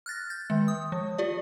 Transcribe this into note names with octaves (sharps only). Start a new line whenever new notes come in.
F6 F#6 A6 A#6
G6 A6
D#3 G#3
D#6
F3
F4 G4 D5